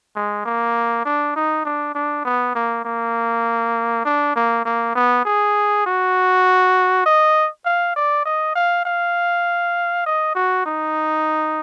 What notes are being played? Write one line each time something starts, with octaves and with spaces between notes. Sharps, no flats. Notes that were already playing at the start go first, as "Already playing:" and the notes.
G#3
A#3
D4
D#4
D4
D4
B3
A#3
A#3
D4
A#3
A#3
B3
G#4
F#4
D#5
F5
D5
D#5
F5
F5
D#5
F#4
D#4